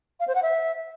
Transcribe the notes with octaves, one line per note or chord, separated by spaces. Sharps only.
F5
C5
F#5
E5